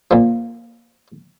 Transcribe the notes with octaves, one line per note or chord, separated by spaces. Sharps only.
A#2 F3